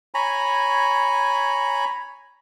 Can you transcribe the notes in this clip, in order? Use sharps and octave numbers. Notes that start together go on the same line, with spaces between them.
C#5 G#5 A#5 B5